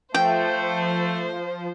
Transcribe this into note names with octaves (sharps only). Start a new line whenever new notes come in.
F3 A3 C5 G5